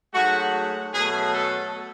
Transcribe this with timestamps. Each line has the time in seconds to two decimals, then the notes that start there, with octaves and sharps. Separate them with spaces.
0.14 G#2 F#3 A3 F#4
0.93 B2 F#3 A3 G#4
1.33 A4